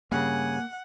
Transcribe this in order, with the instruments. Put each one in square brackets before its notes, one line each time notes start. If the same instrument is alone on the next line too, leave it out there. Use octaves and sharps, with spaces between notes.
[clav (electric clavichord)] G2 C#3 [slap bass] A#3 [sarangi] F#5 [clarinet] G#5